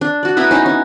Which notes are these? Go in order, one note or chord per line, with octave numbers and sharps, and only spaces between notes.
D4
F#4 D5
B3 E4 B4 A#5
C#4 D#4 E4
C#4